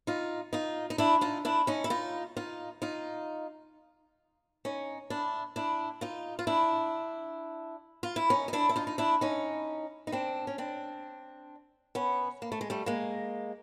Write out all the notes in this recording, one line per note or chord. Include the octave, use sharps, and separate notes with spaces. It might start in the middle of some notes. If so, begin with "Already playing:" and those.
D#4 F4
D#4 F4
D#4
D4 E4
D#4 F4
D4 E4
C#4 D#4
E4
D#4 F4
D#4 F4
D#4 F4
C#4 D#4
D4 E4
D4 E4
D#4 F4
F4
D4 E4
F4
E4
C#4 D#4
D#4
D4 E4
E4
D#4 F4
D#4
D4 E4
C#4 D#4
D#4
C4 D4
C#4
C4 D4
B3 C#4
A#3
A3
G#3
G3 A3
G#3 A#3